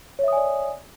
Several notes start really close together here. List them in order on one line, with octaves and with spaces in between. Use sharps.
C#5 E5 D#6 G#5 D5